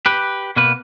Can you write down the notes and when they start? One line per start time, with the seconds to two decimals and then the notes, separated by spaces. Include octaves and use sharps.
0.06 G4 B4
0.56 B2 A#3 B4